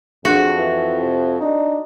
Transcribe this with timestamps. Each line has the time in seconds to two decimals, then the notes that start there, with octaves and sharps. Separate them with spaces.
0.25 F2 D4 F#4 G#4
0.58 E3 G5
1.02 C3
1.41 D4 D#4